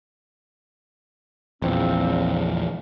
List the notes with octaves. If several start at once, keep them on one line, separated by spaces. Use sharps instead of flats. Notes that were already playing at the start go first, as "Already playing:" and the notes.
A#1 E2 F3 C4